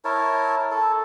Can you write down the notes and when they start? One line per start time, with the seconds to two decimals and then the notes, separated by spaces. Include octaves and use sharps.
0.05 E4 A#4 C#5 A5
0.71 A4 A5